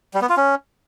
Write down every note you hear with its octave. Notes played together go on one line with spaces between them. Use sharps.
G3
B3
F4
C#4